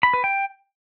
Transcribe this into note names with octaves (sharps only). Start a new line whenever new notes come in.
B5
B4
G5